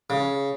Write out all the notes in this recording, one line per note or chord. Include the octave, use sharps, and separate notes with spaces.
C#3